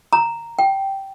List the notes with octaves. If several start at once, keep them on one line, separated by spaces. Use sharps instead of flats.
A#5
G5